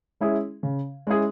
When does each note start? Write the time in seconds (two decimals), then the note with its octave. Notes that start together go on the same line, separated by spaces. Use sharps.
0.21 G#3 C#4 E4 G#4
0.63 C#3
1.07 G#3 C#4 E4 G#4